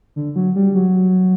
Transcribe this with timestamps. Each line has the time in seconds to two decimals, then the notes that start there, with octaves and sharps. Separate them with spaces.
0.16 D3
0.36 F#3
0.56 G3
0.75 F#3